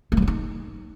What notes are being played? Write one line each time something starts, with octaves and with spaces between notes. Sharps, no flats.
A#3
F#3
C4
D#4